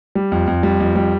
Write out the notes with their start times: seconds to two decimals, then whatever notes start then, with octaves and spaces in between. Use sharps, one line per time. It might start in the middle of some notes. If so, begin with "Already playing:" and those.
0.15 G3
0.32 F2
0.47 F2
0.63 G3
0.80 F2
0.96 G3